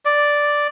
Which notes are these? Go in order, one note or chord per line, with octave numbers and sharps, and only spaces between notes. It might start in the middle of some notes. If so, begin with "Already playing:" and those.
D5